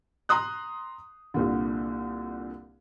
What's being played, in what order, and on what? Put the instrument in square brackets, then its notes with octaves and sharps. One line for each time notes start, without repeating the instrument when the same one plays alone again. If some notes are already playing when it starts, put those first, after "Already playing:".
[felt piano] A#5 C6 D#6 F#6
C2 A#2 D3